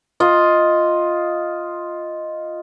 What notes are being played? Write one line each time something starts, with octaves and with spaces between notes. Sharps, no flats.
F4 D#5